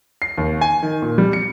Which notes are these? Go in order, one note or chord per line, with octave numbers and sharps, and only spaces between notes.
C7
D#2
G#5
D#3
A#2
G3
C#7